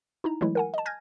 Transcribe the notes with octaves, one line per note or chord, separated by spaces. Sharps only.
D#4 E4 A#5
E3 F#3 G#3 A3 E4
A#4 F#5 G#5
D#5 A5
G#5 F6 G6 G#6 A#6